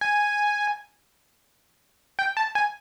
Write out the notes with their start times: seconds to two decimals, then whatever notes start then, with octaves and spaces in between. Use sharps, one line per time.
0.01 G#5
2.19 G5
2.37 A5
2.55 G#5